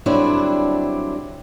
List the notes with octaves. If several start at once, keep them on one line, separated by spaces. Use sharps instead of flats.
D3 F#3 G3 C4 D4 E4